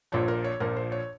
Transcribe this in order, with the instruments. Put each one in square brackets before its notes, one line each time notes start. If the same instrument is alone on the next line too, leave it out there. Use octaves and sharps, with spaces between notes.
[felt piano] A#1 A#2 F3 C#5
A#4
C#5
A#1 A#2 F3 A#4
C5
C#5